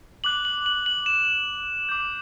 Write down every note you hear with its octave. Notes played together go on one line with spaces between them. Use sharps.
D6 F#6 F#7
F#7
F#7
F#7
E7
D6 G6